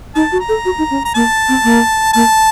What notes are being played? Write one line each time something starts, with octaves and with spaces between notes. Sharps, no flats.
D#4 A5
F#4
A#5
A4
F#4
D#4
C#4
A#5
A#3 A5
C4
A#3
A#3 A5